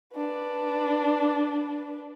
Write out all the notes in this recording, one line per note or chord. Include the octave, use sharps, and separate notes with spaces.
D4 B4